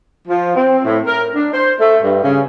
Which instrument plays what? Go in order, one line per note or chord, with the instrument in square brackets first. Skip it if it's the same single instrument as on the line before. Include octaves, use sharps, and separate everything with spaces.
[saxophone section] F3
C4
A2
A#4
D4
C5
A3
G2
C#3